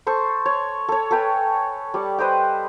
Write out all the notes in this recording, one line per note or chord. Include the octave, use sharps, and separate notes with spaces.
A4 C5 C#6
C#5
A4 C#5
A4 B4 G5 G#5
G3 D5 C#6
B4 C5 D#5 G5